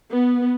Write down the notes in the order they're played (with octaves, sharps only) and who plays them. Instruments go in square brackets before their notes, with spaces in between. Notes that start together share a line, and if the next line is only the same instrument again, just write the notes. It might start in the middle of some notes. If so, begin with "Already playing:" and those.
[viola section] B3